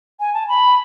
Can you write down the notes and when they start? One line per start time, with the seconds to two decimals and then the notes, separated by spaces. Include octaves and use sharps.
0.20 G#5
0.34 A5
0.49 B5